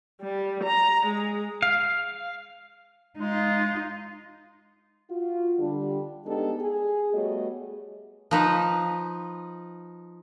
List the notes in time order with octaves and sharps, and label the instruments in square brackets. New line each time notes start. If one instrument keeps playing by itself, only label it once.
[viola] G3
A#5
G#3
[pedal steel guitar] F5
[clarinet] G#3 [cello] D#4 F4
[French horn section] F4 F#4
D3 G3 D4
G#3 B3 D4 D#4 G4 A4
G#4
G3 A3 B3 F#4 C#5 D#5
[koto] F3 D#4 B4